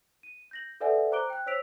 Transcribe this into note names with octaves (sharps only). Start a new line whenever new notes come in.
D#7
G6 A#6 F#7
A4 B4 D5 E5 F#5 G#5
C5 A#5 D6 F#6 D7 G7
G5 F#6
C5 C#5 E6 B6 D7 F7